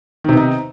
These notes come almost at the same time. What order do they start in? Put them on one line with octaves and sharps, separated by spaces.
D#3 C3 B3 D#4